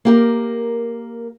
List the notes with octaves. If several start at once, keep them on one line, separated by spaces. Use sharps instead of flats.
A#3 G4 A#4